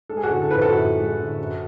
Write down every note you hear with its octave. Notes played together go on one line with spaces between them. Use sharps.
G#3 A4
G#4
F#4 A4
D3
A4
F3 B4
F#4 A4
F#2
G#3
D3
F#2